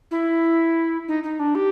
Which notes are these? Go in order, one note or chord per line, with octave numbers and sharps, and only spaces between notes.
E4
D#4
D#4
D4
G4